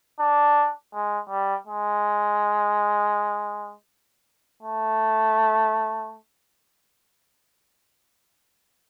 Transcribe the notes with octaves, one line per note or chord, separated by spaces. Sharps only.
D4
G#3
G3
G#3
A3